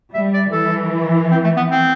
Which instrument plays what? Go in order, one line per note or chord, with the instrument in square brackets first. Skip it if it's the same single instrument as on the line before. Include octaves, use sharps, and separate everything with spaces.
[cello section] G3 [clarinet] E5
[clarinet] D5
[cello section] E3 [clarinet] A4
[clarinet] C4
A3
B3
C4